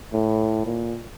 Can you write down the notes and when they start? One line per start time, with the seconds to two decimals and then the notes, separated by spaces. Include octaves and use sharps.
0.13 A2
0.66 A#2